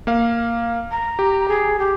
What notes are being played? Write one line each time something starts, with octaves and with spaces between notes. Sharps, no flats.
A#3 F5
A#5
G4
G#4
G4